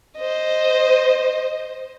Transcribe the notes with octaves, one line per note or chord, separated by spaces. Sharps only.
C5 D#5